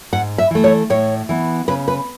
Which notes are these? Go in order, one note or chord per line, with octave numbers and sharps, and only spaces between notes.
G#2 F#5
E5
E3 A3
C#5
A2 C#5
E3 B3
C#3 B4
B4